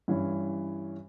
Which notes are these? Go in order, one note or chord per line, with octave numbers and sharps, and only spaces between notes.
G2 E3 C#4